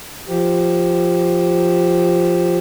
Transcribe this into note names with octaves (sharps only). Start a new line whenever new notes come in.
F3 G4